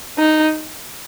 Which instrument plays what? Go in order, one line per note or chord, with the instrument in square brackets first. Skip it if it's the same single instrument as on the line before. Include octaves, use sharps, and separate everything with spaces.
[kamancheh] D#4